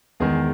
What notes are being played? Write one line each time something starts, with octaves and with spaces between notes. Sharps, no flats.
E2 D#3 G#3 G#4